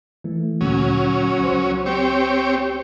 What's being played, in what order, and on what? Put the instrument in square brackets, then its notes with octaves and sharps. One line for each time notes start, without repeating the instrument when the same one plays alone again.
[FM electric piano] E3 A3
[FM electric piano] D2 A#2 [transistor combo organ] F#3 C#4
[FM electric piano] C#2 C5
[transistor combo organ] C4 G4 C#5